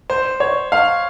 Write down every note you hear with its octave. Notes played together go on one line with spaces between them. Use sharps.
C5
C#5
F5